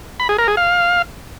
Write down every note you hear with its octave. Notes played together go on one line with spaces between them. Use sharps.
B5
G#4
A#4
G#4
F5